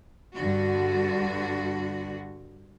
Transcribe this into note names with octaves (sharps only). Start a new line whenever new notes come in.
G2 D3 F#4